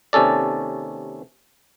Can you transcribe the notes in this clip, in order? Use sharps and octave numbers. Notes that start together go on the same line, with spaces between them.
D#2 C3 C#4 A4 D5